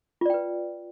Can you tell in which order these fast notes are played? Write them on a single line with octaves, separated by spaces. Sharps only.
F4 D5 G5 B4